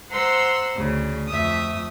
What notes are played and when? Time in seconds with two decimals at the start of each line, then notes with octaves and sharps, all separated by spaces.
0.10 C5 F#5 A#5 C6 E6
0.76 D2 C#3
1.28 F2 A3 E5 D#6